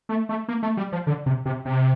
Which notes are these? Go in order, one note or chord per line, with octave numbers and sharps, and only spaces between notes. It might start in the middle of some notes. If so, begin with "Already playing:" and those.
A3
A3
A#3
A3
G3
F3
D3
C3
C3
C3